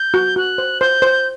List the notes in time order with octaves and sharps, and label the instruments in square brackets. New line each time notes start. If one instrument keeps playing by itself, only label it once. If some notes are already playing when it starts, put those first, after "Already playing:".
Already playing: [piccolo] G6
[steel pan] F#4
[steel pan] F#4 [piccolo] F#6
[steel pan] C5
[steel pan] C5 [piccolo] G6
[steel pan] C5